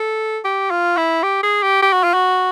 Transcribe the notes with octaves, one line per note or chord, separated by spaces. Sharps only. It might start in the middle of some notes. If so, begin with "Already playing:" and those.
Already playing: A4
G4
F4
E4
G4
G#4
G4
G4
F#4
F4
F#4